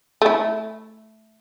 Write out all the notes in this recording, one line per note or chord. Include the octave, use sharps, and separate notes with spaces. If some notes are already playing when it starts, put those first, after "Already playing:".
A3 E4